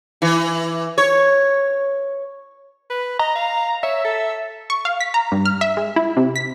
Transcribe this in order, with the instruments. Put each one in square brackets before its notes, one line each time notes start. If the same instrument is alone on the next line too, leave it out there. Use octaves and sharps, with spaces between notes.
[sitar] E3
C#5
[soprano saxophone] B4
[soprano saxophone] D#5 [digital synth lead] A#5
[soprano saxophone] F5
[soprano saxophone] C#5 [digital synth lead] E5
[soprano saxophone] A4
[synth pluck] C#6
F5
B6
A#5
G2
F6
E5
G#3
E4
C3
B6